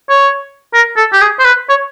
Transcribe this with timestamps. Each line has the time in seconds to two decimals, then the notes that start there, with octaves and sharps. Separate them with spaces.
0.10 C#5
0.74 A#4
0.97 A4
1.13 G4
1.21 G#4
1.39 C5
1.45 B4
1.69 C#5